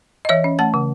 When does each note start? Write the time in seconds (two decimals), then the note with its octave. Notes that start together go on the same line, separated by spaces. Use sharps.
0.25 D#5
0.29 E3 C#5 E5
0.44 C#4
0.59 A3 F#5 A5
0.74 C#3